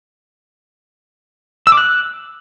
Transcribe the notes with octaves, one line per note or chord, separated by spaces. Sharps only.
E6
D6
F#6